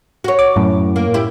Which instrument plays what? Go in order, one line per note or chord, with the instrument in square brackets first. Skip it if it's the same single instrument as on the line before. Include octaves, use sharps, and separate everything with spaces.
[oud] F#4 C#5
[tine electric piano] D6
F#2 A2
[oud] A#3
E4 G4